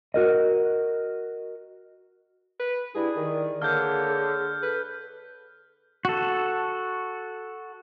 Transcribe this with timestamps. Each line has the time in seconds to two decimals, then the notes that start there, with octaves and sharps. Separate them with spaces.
0.14 F#4 A#4 D#5
2.60 B4
2.95 G2 E4 G#4 D5
3.16 D#3
3.62 D3 A#3 G#4 C#5 F6 G6
4.63 A4 B4
6.05 F#4 A4